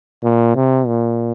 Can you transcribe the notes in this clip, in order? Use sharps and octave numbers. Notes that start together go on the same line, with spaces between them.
A#2
C3
A#2